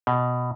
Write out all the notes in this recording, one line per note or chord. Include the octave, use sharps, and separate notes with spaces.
B2